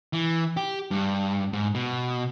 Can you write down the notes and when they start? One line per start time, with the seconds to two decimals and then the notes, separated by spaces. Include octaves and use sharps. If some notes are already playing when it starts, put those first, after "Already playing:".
0.13 E3
0.57 G4
0.91 G2
1.53 G#2
1.75 B2